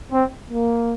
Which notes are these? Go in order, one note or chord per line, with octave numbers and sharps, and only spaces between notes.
C4
A#3